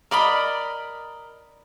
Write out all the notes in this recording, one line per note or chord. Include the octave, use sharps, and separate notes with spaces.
A#4 D5 D#5 B5